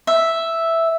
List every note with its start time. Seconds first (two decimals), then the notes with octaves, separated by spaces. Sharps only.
0.07 E5